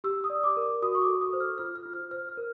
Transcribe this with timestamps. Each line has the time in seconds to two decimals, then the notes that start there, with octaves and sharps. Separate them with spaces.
0.04 G4 E6
0.24 D#6
0.30 D5
0.44 D6
0.57 A#4
0.62 D6
0.82 F#4 D#6
0.95 C#6
1.02 D6
1.07 A4
1.21 D#6
1.33 C5
1.40 F6
1.58 F4 F6
1.76 F6
1.86 F4
1.93 F6
2.11 C5 F6
2.29 F6
2.37 A#4